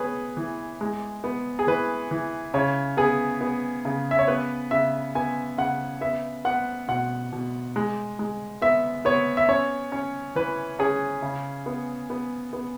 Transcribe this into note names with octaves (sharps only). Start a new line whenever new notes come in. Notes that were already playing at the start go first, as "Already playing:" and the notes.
Already playing: B3 G#4 B4 C#5
E3
G#3
B3
G#4
E3 B4
E3
C#3 C#5
B3 G#4
B3
C#3
E5
C#5
B3 B4
C#3 E5
B3 G#5
C#3 F#5
B3 E5
B3 F#5
B2 F#5
B2
G#3
G#3
B3 E5
B3 C#5
E5
C#4 C#5
C#4
E3 B4
C#4 G#4
C#3
B3
B3
B3